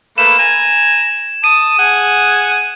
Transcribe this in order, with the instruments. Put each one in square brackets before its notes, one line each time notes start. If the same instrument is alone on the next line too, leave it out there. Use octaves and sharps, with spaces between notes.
[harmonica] A3 A#3 B4 [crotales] E7
[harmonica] G#5 A#5
[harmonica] A5 D#6 [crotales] D#7
[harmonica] G#4 F#5 G#5